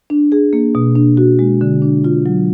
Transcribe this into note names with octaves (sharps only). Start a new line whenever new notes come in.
D4
G#4
A#3
B2
D4
F#4
G#3
D3
D4
F4
F#3